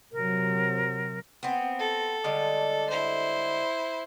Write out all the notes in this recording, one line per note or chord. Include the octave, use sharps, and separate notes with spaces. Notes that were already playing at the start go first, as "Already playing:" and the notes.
C3 F#3 A#4
B3 C4
A4
D3 G3 G#3
E4 C5